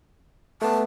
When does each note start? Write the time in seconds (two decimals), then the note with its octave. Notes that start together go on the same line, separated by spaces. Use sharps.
0.62 A3 B3 A5